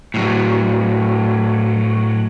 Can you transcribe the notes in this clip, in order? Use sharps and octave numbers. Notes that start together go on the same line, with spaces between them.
A2 F#3